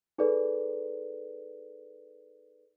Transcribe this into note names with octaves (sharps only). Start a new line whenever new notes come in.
D#4 G#4 A4 B4 D5